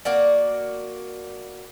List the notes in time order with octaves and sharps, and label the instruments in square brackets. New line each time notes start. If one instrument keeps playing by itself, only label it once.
[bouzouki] A#3 F#4 D5